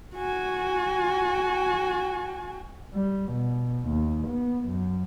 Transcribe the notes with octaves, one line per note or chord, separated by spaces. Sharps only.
F#4 G#5
G3
B2
D#2
B3
F#2